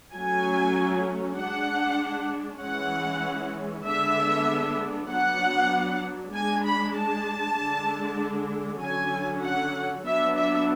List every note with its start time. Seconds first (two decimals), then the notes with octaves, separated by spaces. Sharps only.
0.13 F#3 A3 C#4 G#5
1.37 G#3 D4 F#5
2.61 E3 G#3 C#4 F#5
3.85 D3 G#3 B3 D4 E5
5.10 F#3 B3 D4 F#5
6.33 G#3 D4 G#5
6.64 B5
6.95 A5
7.57 D3 G#3 D4
8.81 D3 F#3 C#4 G#5
9.43 F#5
10.05 F#3 B3 D4 E5
10.36 E5